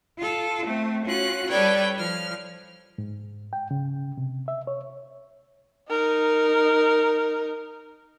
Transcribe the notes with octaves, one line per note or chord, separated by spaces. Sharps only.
F4 A4
A3 C4
C#4 F4 F#4 F#6
G3 A4 B4 C#5 D5 G5
F3 F6
G#2
G5
C#3
C3
E5
C#5
D#4 A#4